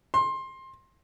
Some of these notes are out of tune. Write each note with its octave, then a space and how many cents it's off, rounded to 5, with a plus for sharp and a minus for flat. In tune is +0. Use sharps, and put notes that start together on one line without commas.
C6 +20